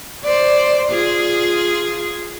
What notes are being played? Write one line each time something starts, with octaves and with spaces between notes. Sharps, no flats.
C5 D5
F4 G#4